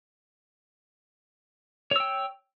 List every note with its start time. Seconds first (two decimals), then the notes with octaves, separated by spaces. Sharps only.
1.91 C#5
1.96 E6
2.00 G5